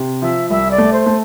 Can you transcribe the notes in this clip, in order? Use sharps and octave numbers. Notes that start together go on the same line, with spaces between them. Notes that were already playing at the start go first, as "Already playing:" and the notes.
Already playing: C3
F3 E5
C2 E5
D5
A3
C5
A3